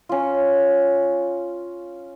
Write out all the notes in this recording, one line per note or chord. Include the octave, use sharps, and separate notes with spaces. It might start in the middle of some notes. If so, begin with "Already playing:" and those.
C#4 F4